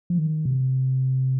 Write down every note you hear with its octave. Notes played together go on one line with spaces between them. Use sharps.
F3
D#3
C3